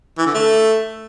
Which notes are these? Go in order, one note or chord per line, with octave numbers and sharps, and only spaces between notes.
E3
D3
A3